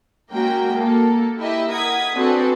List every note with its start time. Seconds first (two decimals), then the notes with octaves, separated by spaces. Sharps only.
0.31 G#3 A#3 C#4 F#4 A#4 G5
0.74 A#3 A4
1.38 E4 G4 D#5 E5
1.70 A#4 F#5 D#6 G#6 B6
2.14 C4 D4 F#4 G#4 A4 B4